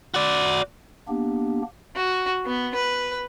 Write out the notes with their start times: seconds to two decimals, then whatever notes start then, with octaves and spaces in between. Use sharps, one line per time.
0.14 F#4 D5
1.08 A#3 B3 D4 G4
1.96 F#4
2.45 B3
2.75 B4